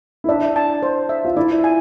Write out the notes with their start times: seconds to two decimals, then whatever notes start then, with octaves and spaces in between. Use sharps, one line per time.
0.24 E4
0.29 D4 E5
0.56 A5
0.83 C5
1.09 E5
1.25 F4
1.37 E4 D5
1.64 G#5